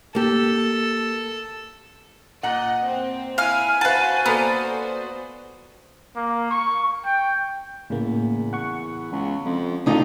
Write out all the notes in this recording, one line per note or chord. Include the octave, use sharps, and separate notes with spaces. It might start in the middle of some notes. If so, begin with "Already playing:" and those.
A#3 G4 A4
A#2 D#5 F#5
C4
E4 F5 G#5 F6
F#4 B4 C5 F5 F#5 A5
A#3 B3 A4 D5
A#3
C#6
G5
E2 A2 C#3 A#3
F#5 C#6
C#2
F2
A1 D2 C#3 D#4 F4